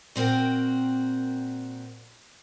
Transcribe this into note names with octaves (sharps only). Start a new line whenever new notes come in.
A#2 C4 F#4 A#4 G5